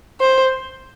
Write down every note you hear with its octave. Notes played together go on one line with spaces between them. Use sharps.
C5